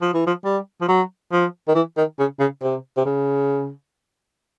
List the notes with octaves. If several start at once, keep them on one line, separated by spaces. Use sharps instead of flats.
F3
E3
F3
G3
F3
F#3
F3
D#3
E3
D#3
C#3
C#3
C3
C3
C#3